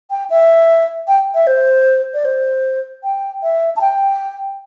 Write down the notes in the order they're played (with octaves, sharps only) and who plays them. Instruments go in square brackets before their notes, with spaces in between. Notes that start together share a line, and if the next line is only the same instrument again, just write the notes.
[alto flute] G5
E5
G5
E5
C5
D5
C5
G5
E5
A5
G5